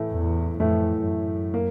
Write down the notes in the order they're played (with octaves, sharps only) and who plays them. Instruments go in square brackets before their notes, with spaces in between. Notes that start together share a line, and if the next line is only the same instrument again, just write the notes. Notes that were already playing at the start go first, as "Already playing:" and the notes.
Already playing: [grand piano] A2 E3 A3
[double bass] E2
[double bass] F2 [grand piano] A2 E3 A3
[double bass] F#2
[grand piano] A#3